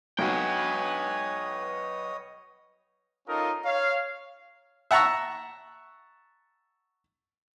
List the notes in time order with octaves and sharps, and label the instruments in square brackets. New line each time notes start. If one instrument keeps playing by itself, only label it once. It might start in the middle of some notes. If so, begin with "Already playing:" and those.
[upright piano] B1 F#4 [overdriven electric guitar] B4 G5 [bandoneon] C#5 D#5 D#6 [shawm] G#5
[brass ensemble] C#4 D#4 F4 A4 A#4 D#5
C#5 F5
[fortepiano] E5 F#5 A5 A#5 C#6 E6